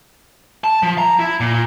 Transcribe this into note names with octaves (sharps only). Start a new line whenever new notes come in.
A5
F3
A#5
E4
A#2